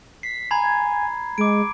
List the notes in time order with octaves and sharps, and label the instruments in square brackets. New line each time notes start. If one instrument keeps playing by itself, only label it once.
[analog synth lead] B6 [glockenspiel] C7
[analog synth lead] G#5 [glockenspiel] A#5 B5 G#6
[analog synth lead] G#3 [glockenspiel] D6 D7